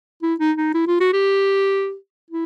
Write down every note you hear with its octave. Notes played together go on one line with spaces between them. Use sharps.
E4
D#4
D#4
E4
F4
F#4
G4
E4